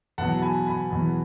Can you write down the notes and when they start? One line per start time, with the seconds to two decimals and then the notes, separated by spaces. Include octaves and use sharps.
0.18 E2 B2 F#3 F#5 A5
0.39 A5
0.42 G#5 B5
0.66 G#5 B5
0.91 E2 B2 F#3